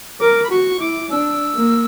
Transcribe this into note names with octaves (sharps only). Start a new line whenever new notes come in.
A#4 D6
B5
F#4 C#6
E4 D6
D4 E6
A#3